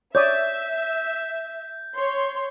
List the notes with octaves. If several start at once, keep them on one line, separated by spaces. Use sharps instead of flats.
C#5 D5 E5 D#6 G6
C#5 C6